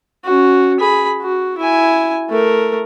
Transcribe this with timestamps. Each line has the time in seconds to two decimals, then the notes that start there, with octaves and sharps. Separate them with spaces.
0.24 C#4 F#4
0.80 G#4 B5
1.21 F#4
1.58 E4 G#5
2.29 A3 A#4